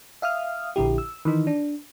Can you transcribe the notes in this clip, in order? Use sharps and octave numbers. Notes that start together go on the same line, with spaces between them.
E5 F5 D#6 F6
A#1 D3 E4 G4
E6
D#3 E3 D#4
D4